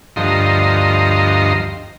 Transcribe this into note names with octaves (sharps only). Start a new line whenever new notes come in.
D2 G2 F3 D#5 A#5 C6